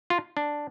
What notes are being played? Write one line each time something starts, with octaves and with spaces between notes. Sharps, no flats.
F4
D4